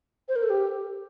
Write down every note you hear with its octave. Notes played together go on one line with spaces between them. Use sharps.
C5
A#4
A4
G4